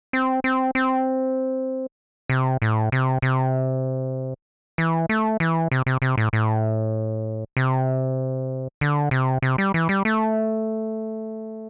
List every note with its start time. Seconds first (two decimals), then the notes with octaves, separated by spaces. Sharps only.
0.13 C4
0.44 C4
0.75 C4
2.30 C3
2.62 A2
2.92 C3
3.22 C3
4.78 E3
5.09 A3
5.40 E3
5.72 C3
5.86 C3
6.02 C3
6.18 A2
6.33 A2
7.57 C3
8.81 D3
9.11 C3
9.42 C3
9.58 G3
9.74 E3
9.89 G3
10.05 A3